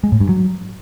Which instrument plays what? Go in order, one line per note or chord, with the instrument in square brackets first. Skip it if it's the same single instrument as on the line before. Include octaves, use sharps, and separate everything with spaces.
[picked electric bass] G#3
A2
G2
F#3